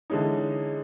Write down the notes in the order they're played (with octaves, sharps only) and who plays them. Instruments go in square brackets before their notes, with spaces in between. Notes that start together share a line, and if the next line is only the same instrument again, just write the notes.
[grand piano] D3 E3 G#3 C#4 D#4